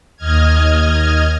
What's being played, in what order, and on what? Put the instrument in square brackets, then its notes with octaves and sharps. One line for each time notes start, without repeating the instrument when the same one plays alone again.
[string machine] D#2 D#5 F6 G#6